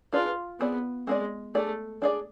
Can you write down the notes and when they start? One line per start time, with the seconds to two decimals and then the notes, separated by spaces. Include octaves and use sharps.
0.13 D4 F4 G#4 B4 D5
0.60 B3 C4 G#4 D5
1.07 G#3 C4 G#4 D5
1.55 A3 D4 G#4 D5
2.02 D4 G#4 D5